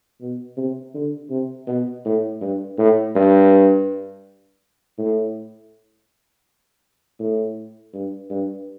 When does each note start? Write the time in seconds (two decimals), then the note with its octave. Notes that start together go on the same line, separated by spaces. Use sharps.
0.21 B2
0.57 C3
0.94 D3
1.30 C3
1.67 B2
2.05 A2
2.41 G2
2.78 A2
3.15 G2
4.99 A2
7.19 A2
7.93 G2
8.30 G2